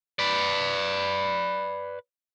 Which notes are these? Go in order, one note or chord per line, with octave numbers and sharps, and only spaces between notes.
B4 D5